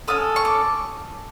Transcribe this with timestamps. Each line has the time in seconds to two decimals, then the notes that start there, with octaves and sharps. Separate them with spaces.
0.08 C#4 F4 A4 D#6
0.36 C#6
0.45 D6